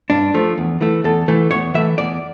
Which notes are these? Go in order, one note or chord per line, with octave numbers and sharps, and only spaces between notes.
G2 D4
F3 A3
E2
E3 A3
E2 A4
E3 A3
E2 C#5
E3 A3 E5
E2 D5